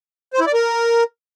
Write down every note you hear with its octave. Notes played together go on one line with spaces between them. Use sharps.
C5
E4
D5
A#4